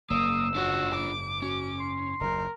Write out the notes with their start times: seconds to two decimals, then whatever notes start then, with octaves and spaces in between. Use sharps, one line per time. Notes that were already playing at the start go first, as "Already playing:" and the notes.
0.10 F#1 G#2 A#3 D#6 E6
0.55 D4 F4 F#4 C#5
0.95 D6
1.42 C#4 F#4
1.80 C6
2.21 F#1 D#2 A#4